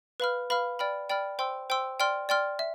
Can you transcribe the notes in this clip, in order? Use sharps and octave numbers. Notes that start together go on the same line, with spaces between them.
B4 F5 B5 F6
B4 F5 B5 F6
D5 G5 B5 F6
D5 G5 B5 F6
C5 G5 C6 E6
C5 G5 C6 E6
D5 G5 C6 F6
D5 G5 C6 F6
E5